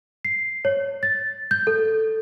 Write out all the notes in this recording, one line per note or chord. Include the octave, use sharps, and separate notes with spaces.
C7
C#5
A6
G6
A4